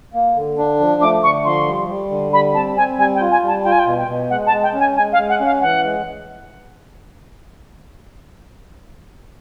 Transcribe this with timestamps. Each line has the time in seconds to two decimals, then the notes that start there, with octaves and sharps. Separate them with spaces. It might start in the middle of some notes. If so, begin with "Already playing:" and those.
0.14 A#3
0.36 D3
0.58 D4
0.80 F3
1.01 A3 D6
1.23 D3 C#6
1.45 F3 C6
1.67 G3
1.89 G3
2.10 D3
2.32 G3 B5
2.54 C4 A5
2.77 C4 G#5
2.98 G3 G#5
3.15 G5
3.21 F4
3.31 G#5
3.43 G3 A5
3.64 F4 G5
3.72 G#5
3.79 G5
3.86 B2
3.97 G5
4.08 B2
4.30 G#3 F#5
4.47 A5
4.53 G#3
4.63 G5
4.74 C#4
4.79 G#5
4.96 G#3 G#5
5.13 F5
5.18 G#3
5.29 F#5
5.40 C#4
5.46 F5
5.61 E3 F#5
5.84 G#3